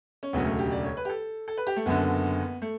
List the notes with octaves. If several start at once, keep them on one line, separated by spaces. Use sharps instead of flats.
C#4
E1 D2 C#3 F#3 B3
A3
G4
D5
C#5
B4
G4
A4
A4
B4
G4
A3
F#1 F#2 D3 B3
A3